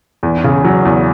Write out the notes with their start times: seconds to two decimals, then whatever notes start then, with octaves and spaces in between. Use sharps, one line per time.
0.23 E2
0.44 C#3
0.65 F#3
0.85 E2